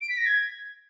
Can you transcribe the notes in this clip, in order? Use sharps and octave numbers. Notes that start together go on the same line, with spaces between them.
D7
B6
A#6
G#6